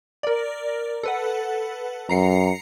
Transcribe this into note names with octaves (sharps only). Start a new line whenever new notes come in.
A#4 D5
A4 B4 F#5
F#2 A#5 C7 C#7